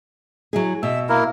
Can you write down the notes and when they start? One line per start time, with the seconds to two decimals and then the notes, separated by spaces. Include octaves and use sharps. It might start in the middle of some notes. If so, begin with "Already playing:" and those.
0.53 F#3 E4 G#4
0.83 B2 E5 E6
1.09 A#3 E4 A#4